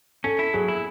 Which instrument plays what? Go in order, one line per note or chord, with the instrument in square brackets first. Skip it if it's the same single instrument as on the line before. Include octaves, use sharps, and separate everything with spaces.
[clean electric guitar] C#4 [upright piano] A4
[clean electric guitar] E4
[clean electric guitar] F#3 [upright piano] G#4
[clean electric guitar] E4